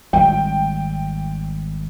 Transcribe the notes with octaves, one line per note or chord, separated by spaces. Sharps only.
G#1 G3 G5